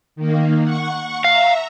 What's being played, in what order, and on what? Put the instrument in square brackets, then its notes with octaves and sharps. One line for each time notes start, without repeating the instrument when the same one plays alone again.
[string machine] D#3 A#3
F#5 C#6
[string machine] E5 A#5 [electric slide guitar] F5